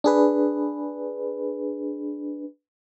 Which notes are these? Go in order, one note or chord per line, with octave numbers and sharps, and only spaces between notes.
D4 G#4 B4